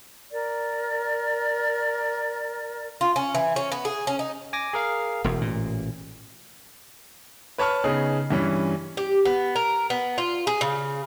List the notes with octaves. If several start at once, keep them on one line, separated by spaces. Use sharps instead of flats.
A#4 D5
F4
C#4
E3
C#4
B3
G#4
C#4
D#4
G#5 D6 A#6
G#4 A#4 F5
E1 E2
A1 A#2
B4 C#5 A5 C#6 F6
C#3 B3 D#4 G#4
G2 E3 C#4
G4
B3
A#4
B3
F4
G#4
C#3